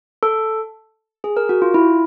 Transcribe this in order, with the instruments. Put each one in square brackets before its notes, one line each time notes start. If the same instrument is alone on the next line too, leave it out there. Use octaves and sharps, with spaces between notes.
[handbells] A4
G#4
A#4
F#4
F4
E4